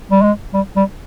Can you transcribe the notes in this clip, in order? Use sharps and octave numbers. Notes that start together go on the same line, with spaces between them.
G3
G#3
G3
G3